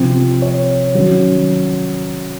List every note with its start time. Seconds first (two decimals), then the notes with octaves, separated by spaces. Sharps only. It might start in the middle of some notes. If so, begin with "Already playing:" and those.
Already playing: C3 F3 C4
0.42 C#5
0.94 D#3 F#3 C#4